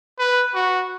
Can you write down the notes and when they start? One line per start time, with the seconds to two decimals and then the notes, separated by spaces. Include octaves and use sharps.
0.19 B4
0.55 F#4